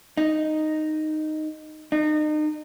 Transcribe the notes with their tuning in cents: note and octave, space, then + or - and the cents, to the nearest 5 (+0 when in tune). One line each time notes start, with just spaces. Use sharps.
D#4 -5
D#4 -35